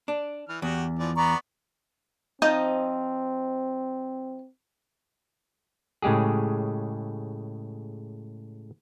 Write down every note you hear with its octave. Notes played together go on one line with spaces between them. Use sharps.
D4
E3 F6
E2 F#4 G4
E3 F3 D5
B3 D5 A#5 C#6
F3 C4 D#4 D#5
A2 C#3 G#3 G4 G#4